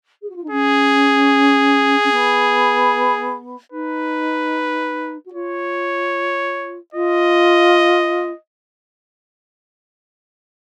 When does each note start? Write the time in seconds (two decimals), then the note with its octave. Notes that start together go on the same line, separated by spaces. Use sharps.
0.22 G#4
0.29 F#4
0.36 F4
0.44 D#4
0.50 C#4 G#4
2.04 C#4
2.11 B3
3.72 D#4 B4
5.25 F#4
5.33 F4 C#5
6.94 F4 D#5